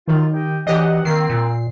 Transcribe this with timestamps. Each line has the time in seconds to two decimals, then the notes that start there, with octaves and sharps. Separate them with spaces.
0.08 F#2 D#3 F4
0.33 G4 D#5 G5
0.67 E3 F#3 D4 G4 D#5 F#5
1.05 D#3 A#3 C4 C7
1.30 A#2